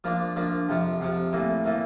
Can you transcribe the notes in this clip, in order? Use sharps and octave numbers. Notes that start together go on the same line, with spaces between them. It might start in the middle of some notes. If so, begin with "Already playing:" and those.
F3 A#3 D4
F3 A#3 D4
F2 C3 F3
F2 C3 F3
A2 E3 A#3
A2 E3 A#3